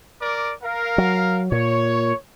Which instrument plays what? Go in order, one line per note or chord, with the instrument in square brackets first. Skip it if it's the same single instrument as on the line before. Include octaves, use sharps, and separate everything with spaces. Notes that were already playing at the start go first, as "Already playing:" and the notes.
[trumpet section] A#4 D5 D6
A#4 F5
[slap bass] F#3
[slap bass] A#2 [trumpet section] C#5